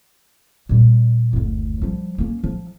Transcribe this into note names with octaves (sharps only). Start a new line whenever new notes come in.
A#2 G3
F#1 D2
F3 G3
A#3 C#4
F3